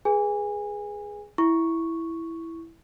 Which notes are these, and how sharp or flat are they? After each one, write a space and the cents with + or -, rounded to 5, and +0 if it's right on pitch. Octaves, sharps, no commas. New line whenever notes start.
G#4 +0 B4 -20 G#5 -25
E4 +0 C#6 +0